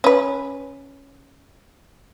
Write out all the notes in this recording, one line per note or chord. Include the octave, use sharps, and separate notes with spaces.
C#4 B4